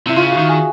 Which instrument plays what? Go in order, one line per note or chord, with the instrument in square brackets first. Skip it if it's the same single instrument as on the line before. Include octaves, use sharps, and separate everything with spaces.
[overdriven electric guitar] C3 [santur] E4
[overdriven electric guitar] C#3 [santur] F4
[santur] F#4
[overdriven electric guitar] D#3
[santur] G#4